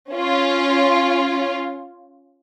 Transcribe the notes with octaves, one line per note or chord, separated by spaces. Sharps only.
C#4 F4